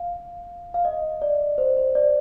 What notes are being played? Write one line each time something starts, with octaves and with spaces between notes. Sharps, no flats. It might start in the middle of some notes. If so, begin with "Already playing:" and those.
Already playing: F5
F5
D#5
D5
C5
C5
D5